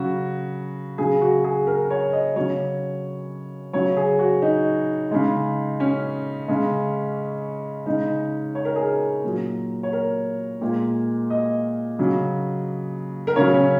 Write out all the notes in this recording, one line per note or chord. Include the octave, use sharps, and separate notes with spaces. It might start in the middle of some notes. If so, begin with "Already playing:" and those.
Already playing: C#3 F#3 F#4
C#3 F#3 G#4
F#4
G#4
A#4
C#5
D#5
C#3 F#3 C#5
C#3 F#3 C#5
G#4
F#4
D#4
C#3 G#3
C#4
C#3 G#3
C#3 G#3 D#4
C#5
A#4
G#4
A#4
A#2 F#3
C#5
A#4
A#2 G#3
D#5
C#3 F#3
A#4
C#3 F#3 C#5
C#4